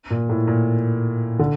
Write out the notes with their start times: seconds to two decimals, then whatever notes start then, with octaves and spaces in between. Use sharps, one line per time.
0.10 A#2
0.29 A2
0.47 A#2
1.39 D3